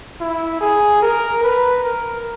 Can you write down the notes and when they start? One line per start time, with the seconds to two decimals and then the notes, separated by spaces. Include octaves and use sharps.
0.21 E4
0.61 G#4
1.02 A#4
1.43 B4
1.84 A#4